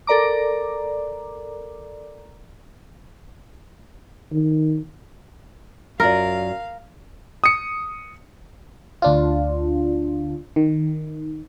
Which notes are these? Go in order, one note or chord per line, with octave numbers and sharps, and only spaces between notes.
A4 A#4 D5 A#5 D6
D#3
F#2 F4 A#4 D5 F5
D#6 C#7
D2 D4 F4
D#3